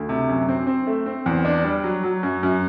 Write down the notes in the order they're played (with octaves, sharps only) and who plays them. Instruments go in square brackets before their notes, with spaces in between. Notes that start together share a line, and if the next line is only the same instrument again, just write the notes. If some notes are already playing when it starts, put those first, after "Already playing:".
Already playing: [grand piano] D2
C3
F#2
C4
C4
A3
C4
E2
D4
G3
F#3
F#3
F#2
F#2